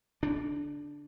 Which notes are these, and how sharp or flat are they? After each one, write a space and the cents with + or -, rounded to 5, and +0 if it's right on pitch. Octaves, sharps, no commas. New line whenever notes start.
D3 -40 D4 +0